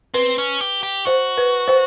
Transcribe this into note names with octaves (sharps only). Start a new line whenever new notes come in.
C4 B4
C#4
G4
G4
F#4 C5
B4
C5